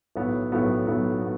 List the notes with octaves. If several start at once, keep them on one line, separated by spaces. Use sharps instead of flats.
B1 A2 F#3 B3
B1 A2 F#3 B3
B1 A2 F#3 B3
B3